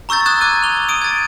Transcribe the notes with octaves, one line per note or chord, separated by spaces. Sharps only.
A#5 C#6 E6 G6 A6
D#6 F#6 G#6 A6 E7
D6 F#6 G#6 D#7
F7 G7
D#6 D7 D#7
G#6 A6